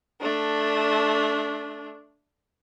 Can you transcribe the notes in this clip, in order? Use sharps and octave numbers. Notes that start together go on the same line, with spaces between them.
A3 D4